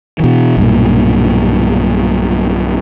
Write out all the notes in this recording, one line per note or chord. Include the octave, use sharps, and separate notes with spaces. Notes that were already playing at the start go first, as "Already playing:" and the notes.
B2 E3
B1 G2 A#2